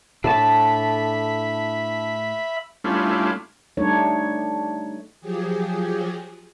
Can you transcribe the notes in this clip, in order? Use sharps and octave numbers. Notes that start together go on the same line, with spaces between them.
A2 D4 E5 A5 B5
G3 A3 C#4 D4 E4 F4
G3 A3 D4 D#4 C#5
F3 F#3 G4 G#4